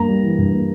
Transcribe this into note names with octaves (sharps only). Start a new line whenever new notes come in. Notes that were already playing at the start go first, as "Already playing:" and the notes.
Already playing: G2 A#3 A#5
G3
E3
G2
A#3